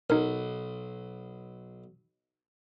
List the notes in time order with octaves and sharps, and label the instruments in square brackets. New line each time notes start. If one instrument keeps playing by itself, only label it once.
[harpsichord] B1 [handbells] D#4 A#4